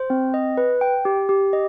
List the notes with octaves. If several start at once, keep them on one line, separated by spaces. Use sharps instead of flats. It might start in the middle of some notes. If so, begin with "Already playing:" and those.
Already playing: C5
C4
D#5
B4
G5
G4
G4
D#5